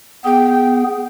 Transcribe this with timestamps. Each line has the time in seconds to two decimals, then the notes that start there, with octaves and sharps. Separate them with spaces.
0.25 B3 G#4 G5